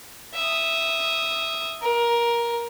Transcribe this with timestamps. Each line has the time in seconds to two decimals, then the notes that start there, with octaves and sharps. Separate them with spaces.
0.34 E5 D#6
1.82 A#4